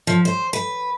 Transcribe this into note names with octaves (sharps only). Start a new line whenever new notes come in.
F3
C5
B4